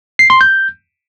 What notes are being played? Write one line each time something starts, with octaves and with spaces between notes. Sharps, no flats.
C7
C6
G6